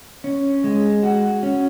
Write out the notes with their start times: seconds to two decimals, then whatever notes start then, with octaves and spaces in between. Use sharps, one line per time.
0.24 C#4
0.64 G#3
1.03 F#4
1.43 C#4